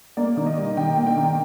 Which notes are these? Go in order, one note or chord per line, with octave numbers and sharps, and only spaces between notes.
A#3 D5
D#3
D#5
G3
D#3 G5
A#3
G5
D#3